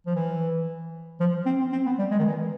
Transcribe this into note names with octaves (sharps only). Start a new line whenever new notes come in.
F3
E3
F3
C4
C4
C4
B3
G3
G#3
D#3
E3